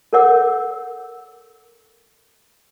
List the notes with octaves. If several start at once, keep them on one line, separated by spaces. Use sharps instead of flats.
A4 A#4 C#5 F#5 D6 E6